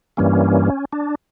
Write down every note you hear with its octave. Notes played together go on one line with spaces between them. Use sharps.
G2 E3 G3 A#3 C#4
D4